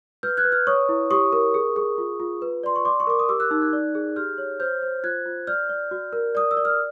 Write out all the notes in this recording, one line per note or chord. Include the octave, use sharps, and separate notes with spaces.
B4 F6 G6
F#6 G#6
B4
F6 G6
C#5 C#6 D#6
E4
G4 C#6 D#6
A#4
G#4
G#4
F4
F4
B4
D5 C6
C#6
D5 C6 D6
C#6
A#4 D6
D#6
G4 D6 E6
E6 F#6
D#4 E6 F#6
F#6 G#6
D5
G#4
G4 F6 G6
C#5
C5 F6 G6
C5
F4 F#6 G#6
F4
D5 F6 G6
D5
F#4
A#4
D5 D#6
E6
D5
F6